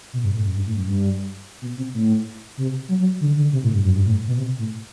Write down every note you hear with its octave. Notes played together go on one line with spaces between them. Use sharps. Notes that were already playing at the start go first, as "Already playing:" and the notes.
B2
G2
A2
F#2
G2
A2
F#2
G2
B2
C3
A2
C3
F#3
F#3
D3
D3
C3
A2
G2
F#2
G2
A2
B2
C3
A2